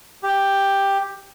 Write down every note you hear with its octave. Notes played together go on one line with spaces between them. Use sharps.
G4